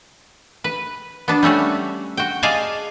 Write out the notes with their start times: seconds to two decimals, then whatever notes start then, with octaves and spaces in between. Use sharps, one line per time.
0.64 B4
1.28 B3 D4 A5
1.43 G3 A3 C#4 F#4
2.17 F#4 G5
2.43 G#4 D5 D#5 F5 G#5 A5